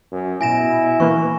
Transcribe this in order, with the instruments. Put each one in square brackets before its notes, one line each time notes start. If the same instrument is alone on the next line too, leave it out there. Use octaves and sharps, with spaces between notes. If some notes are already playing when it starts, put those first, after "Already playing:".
[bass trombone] F#2
[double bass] B2 [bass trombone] E4 [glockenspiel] G#5 A#6 E7
[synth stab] E3 A#3 [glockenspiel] C#6